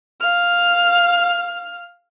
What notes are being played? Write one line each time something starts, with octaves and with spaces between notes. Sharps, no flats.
F5 F6